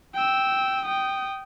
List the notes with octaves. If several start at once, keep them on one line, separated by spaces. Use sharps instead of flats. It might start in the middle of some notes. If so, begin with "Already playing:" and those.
G5 E6
G5 D#6